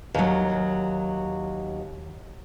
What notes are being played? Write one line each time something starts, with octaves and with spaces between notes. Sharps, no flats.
D#2 F#3